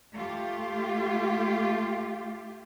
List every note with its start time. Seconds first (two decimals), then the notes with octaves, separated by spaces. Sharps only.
0.13 A3 F4 G4